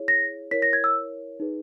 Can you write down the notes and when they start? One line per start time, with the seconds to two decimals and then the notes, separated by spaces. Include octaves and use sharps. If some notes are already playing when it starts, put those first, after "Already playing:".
Already playing: E4 G#4 C#5
0.08 A#6
0.51 E4 A#4 C#5 B6
0.62 A#6
0.73 G#6
0.84 E6
1.40 D#4 G#4 B4